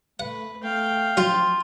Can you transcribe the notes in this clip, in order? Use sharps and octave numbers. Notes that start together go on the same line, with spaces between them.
A3 B4 F#5
A3 F5 G5
F3 F#3 F4